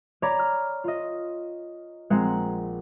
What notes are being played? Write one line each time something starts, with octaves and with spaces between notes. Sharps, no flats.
C#5 D5 A#5 B5 D6
F6
F4 D#5
A#1 G#3 C4 F#5 A#5